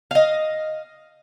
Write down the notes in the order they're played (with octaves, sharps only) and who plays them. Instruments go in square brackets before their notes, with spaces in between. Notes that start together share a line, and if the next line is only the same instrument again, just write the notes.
[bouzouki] D#5 F5